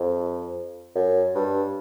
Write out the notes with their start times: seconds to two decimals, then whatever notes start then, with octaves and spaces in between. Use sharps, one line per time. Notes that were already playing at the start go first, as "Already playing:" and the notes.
Already playing: F2
0.95 F#2
1.35 G2